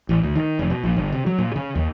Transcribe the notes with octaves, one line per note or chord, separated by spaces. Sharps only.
A1
D2
D#3
F1
B2
A#1
G1
C3
F#3
A#2
C#3
D#2